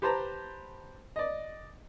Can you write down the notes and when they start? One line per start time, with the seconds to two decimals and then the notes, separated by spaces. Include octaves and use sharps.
0.02 G4 B4 C5 A5 A#5
1.16 D5 D#5